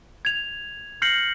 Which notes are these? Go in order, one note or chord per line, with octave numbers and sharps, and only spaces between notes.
G#6 F7
F6 G6 A#6 C7 C#7 F#7